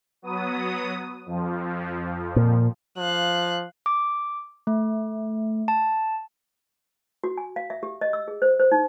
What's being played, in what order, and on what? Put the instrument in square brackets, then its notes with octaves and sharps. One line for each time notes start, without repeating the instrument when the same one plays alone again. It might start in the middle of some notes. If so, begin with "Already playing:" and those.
[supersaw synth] F#3 B3 D#6
F2 F3
[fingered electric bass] A#2
[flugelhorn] F3 [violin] F5 F#6
[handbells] D6
A3
A5
[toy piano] F#4
G#5
F5
E5
G4
D#5
E6
G#4
C5
C5
D#4